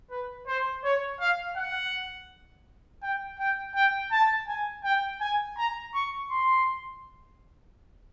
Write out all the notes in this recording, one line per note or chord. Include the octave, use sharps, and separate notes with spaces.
B4
C5
C#5
F5
F#5
G5
G5
G5
A5
G#5
G5
G#5
A#5
C#6
C6